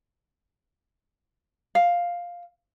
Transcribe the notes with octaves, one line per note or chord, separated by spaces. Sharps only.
F5